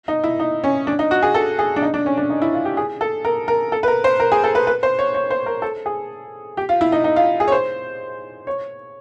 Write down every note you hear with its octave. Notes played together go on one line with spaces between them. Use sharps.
D#4
E4
D#4
C#4
D4
D#4
F#4
G#4
A4
G#4
D4
D#4
D4
C#4
D4
D#4
E4
F4
G4
G#4
A4
A#4
A#4
A4
B4
A#4
C5
A#4
G#4
A4
B4
B4
C5
C#5
C#5
C5
A#4
A4
G#4
G4
F4
E4
D#4
D#4
F4
G#4
C#5
C5
C#5